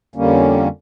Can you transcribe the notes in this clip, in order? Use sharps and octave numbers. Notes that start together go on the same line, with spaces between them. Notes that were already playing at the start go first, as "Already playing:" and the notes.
F2 D3 G3 A#3 C#4